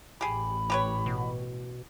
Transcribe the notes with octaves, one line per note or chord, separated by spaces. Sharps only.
A1 G4 G#4 B5
G4 B4 C#5
B2